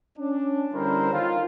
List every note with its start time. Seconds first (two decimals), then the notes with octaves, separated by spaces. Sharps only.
0.18 C#4 D4
0.73 D3 G3 C#4 E4 A#4 C5
1.13 D#3 F4